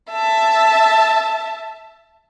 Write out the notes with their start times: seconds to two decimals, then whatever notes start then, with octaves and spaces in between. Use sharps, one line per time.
0.11 E5 A5